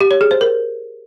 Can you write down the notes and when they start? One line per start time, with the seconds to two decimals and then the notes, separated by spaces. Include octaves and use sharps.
0.01 G4
0.11 C#5
0.21 G#4
0.31 C5
0.41 A#4